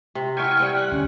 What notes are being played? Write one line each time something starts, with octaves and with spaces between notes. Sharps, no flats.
C3
E4 F#4 G4 G5 G#5 C#6 F6
G3 C4
F#5
D2 C#4